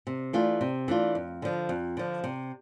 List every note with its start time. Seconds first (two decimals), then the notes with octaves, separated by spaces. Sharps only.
0.07 C3
0.33 E3 A3 D4 F4
0.61 C3
0.88 E3 A3 D4 F4
1.15 F2
1.42 D3 F3
1.69 F2
1.97 D3 F3
2.24 C3